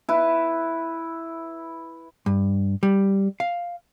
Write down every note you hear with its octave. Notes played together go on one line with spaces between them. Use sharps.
E4 B4
G2
G3
F5